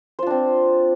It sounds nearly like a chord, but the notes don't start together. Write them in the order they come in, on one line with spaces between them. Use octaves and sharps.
C5 F4 D4 C4